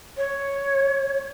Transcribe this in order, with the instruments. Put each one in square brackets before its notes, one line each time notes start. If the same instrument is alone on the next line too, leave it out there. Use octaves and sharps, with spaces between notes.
[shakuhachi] C#5